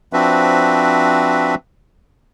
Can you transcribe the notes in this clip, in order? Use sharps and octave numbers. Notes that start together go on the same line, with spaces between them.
F3 C4 D4 F#4 B4 E5